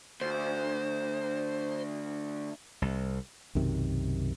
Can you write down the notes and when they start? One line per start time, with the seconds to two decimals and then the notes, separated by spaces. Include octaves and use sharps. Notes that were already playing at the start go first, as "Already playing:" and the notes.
0.21 D2 C5
2.82 C2
3.55 B1 F#2 C3 D#3